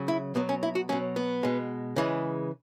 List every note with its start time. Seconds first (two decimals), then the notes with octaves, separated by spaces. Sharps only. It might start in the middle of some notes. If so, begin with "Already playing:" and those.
Already playing: C#3 F#3
0.08 E4
0.35 B2 F#3 B3
0.49 C#4
0.63 E4
0.75 F#4
0.89 B2 F#3 C#4
1.16 B3
1.43 B2 G#3
1.96 C#3 E3 G#3